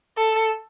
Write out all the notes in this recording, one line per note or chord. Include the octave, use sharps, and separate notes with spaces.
A4